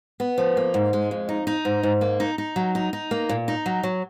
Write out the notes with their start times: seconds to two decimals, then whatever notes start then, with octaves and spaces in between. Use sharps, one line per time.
0.20 B3
0.38 F3
0.57 A#3
0.74 G#2
0.93 G#3
1.11 F2
1.29 D#4
1.47 D#4
1.65 G#2
1.83 G#2
2.01 A#3
2.20 D#4
2.38 D#4
2.56 F#3
2.75 D#4
2.93 D#4
3.11 A#3
3.29 A#2
3.48 D#4
3.66 F#3
3.83 F#3